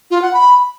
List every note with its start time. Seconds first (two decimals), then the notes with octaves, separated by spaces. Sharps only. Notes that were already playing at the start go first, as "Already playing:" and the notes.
0.11 F4
0.22 F#5
0.33 B5